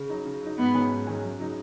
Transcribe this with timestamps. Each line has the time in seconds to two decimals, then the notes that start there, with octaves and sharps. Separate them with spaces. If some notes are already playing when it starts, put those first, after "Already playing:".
Already playing: C#3
0.09 F#3 D#4
0.26 C#3
0.42 F#3 D#4
0.58 G#2 B3
0.74 D#3 F#3 C#4 G#4
0.91 G#2
1.07 D#3 F#3 C#4 G#4
1.23 F#2
1.40 C#3 F#3 D#4